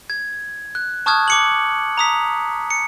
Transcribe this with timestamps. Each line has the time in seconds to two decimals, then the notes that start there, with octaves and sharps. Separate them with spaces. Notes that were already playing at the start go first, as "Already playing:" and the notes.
0.10 G#6
0.75 F#6
1.06 A5 C#6 D#6 F6 F#6 G#6
1.28 D6 C#7 F#7
1.98 A#5 D#6 B6
2.71 C#7